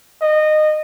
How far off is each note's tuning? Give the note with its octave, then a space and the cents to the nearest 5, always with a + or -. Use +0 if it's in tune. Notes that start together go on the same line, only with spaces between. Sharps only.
D#5 -20